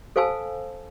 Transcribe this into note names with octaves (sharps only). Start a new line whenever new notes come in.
A4 C5 F5 G#5 A5 E6